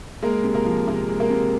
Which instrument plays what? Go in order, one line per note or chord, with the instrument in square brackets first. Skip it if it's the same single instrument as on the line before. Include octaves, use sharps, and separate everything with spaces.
[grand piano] G#3 A#3 A#4
C3
A#3 A#4
F3
C3 A#3 A#4
G#3
A#3 A#4
C3